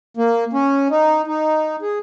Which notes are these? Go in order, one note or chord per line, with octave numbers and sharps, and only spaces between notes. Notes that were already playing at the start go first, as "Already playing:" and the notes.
A#3
C#4
D#4
D#4
G#4